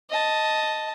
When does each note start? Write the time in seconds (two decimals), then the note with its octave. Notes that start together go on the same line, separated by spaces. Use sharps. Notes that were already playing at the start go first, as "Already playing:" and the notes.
0.10 D#5 A5